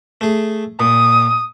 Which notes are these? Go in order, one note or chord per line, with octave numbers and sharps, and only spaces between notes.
A3 G#4
A#2 D#6